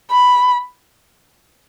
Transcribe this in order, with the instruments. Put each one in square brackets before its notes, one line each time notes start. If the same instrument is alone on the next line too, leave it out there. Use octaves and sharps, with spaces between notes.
[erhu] B5